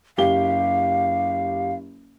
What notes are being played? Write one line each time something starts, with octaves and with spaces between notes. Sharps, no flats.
F#1 G4 F5 G7